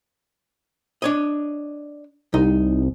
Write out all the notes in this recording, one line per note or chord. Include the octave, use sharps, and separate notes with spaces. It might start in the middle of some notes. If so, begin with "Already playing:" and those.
D4 C#5 D#5
C2 D#4